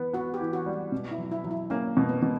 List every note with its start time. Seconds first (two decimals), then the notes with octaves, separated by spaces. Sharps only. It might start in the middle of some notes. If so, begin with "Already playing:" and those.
Already playing: E3 B3
0.13 B3 F#4
0.34 G4
0.40 E3
0.53 F#4
0.66 G3
0.92 B2
1.11 E4
1.18 F#3
1.31 E4
1.44 F#3
1.51 E4
1.70 A#3 C#4
1.97 B2
2.09 B3
2.22 B2